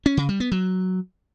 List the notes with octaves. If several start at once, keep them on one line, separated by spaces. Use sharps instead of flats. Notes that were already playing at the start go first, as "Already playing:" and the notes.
C#4
C#3
G3
B3
F#3